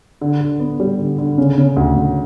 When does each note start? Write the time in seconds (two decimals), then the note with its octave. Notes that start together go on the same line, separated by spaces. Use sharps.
0.21 D3
0.41 D3
0.60 B3
0.80 G3
0.99 D3
1.18 D3
1.38 C#3
1.58 C#3
1.76 D2
1.96 D2